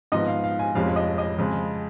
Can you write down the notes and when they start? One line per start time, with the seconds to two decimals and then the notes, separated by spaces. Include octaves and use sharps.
0.12 G#2 F3 B3 D#5
0.27 F5
0.44 F5
0.59 G#5
0.75 F1 F2 F3 G#3 C#4 F5
0.96 D#5
1.18 D#5
1.38 F2 C#3 G#3